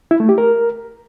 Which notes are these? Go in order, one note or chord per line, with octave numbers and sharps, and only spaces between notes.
E4
A3
G4
A#4